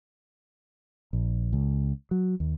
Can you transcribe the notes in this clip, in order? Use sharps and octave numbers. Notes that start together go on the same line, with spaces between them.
A#1
C#2
F#3
D#2